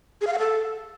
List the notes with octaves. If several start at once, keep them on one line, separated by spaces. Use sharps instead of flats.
G#4
F5
F#5
A4